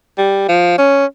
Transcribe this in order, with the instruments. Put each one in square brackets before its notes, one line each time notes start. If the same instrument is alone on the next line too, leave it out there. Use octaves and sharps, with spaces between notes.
[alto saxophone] G3
F3
C#4